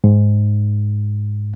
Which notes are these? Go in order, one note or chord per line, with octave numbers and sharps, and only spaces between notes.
G#2